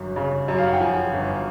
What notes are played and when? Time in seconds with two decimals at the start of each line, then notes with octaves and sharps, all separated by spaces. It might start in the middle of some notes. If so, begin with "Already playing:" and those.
Already playing: G1 F#2
0.16 C#3
0.48 F#2
0.58 F5
0.66 F#5
0.73 G5
0.80 F3 G#5
1.13 G1